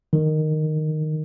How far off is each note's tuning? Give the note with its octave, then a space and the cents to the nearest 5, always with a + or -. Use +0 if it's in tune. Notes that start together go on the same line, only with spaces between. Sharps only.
D#3 -10